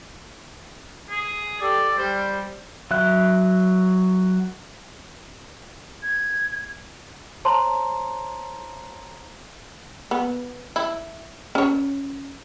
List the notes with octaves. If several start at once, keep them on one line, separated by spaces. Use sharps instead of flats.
G#4
G4 A4 D5
G3 C5
F#3 E5 F#6
G#6
C5 C#5 A5 A#5 C6
B3
E4
C#4 C#5